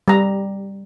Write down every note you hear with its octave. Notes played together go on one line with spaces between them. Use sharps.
G3 A#5